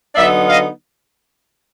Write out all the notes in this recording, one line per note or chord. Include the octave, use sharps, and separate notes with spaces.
D3 F#3 B3 D#4 D5 E5
D#5 F5